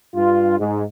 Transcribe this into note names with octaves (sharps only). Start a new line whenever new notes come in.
G2 F4
G#2